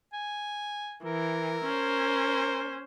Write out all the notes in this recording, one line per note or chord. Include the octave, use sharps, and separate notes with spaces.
G#5
E3 A#4
C#4 C5